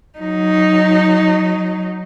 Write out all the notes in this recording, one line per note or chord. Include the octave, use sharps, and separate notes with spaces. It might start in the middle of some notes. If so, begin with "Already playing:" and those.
F#3 D#4